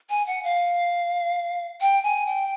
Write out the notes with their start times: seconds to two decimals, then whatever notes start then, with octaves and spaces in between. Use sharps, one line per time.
0.10 G#5
0.27 F#5
0.43 F5
1.81 G5
2.03 G#5
2.27 G5